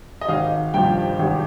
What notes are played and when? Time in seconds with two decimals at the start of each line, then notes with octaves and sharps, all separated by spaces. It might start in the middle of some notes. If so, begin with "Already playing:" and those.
0.21 D#5
0.29 G#1 F5
0.74 G2 F3 G5
1.19 G#1